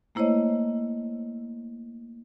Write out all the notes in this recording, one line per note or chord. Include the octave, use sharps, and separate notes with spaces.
A3 A#3 E4 C5 C#5 D#5